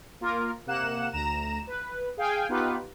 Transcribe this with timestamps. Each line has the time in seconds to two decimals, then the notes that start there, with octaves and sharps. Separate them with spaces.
0.21 A#3 F4 A#4
0.66 C3 A#3 F#5 F#6 E7
1.12 D2 A#5 E7
1.67 B4
2.17 G#4 F5 G5 G#5
2.49 B3 D#4 F4 G4 B4